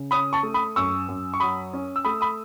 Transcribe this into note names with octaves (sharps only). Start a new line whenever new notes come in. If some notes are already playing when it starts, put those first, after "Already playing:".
Already playing: C#3
C#4 B5 D#6
A5 C#6
A3
B5 D#6
F#2 C#6 E6
F#2
C#6
F#3 B5 D#6
C#4
E6
A3 B5 D#6
B5 D#6